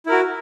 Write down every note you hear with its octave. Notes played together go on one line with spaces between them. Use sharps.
E4 F#4 A#4